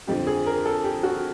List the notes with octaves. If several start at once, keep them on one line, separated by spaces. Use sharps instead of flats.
F2 D3 F3 G4
G#4
A#4
A4
G4
F#4